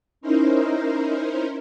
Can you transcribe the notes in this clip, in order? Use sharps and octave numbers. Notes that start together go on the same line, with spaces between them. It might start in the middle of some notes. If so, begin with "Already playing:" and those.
C#4 D#4 E4 A#4 C5